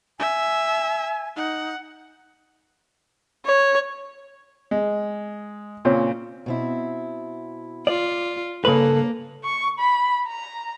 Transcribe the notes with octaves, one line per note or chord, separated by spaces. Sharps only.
E5 G#5
D#4 F#5
C#5
G#3
A#2 C#3 C4 C#5 C6
B2 C4 E4
F4 D5
G2 C#3 A#3 A4 B4 C#5
C#6
B5
A#5